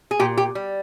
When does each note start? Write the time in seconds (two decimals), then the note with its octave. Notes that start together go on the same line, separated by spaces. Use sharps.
0.11 G#4
0.20 A#2 G4
0.38 G4
0.55 G3